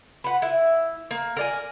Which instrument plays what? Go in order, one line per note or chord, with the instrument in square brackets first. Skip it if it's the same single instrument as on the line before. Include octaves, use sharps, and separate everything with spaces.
[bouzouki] B4 F#5
E4
A#3
A#4 D5 G#5